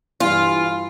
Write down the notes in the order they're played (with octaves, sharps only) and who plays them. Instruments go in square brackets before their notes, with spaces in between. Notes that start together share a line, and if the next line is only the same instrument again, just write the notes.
[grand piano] G2 E3 [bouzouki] F4